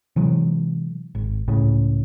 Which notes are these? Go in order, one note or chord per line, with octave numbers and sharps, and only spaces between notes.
C3 E3 F#3 G#3
G#1
C#2 A2 C#3